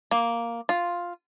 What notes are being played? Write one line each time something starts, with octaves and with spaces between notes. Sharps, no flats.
A#3
F4